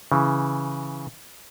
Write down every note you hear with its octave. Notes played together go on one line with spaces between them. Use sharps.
C#3 E3